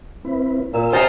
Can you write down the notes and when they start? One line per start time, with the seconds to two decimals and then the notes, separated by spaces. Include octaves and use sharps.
0.25 C4 E4 B4
0.74 A#2 E6
0.93 C3 D#4 F4 C5 G#5 A5